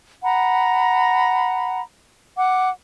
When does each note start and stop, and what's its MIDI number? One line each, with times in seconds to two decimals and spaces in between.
0.23 1.80 78
0.23 1.80 82
0.23 1.80 83
2.37 2.69 78
2.37 2.69 86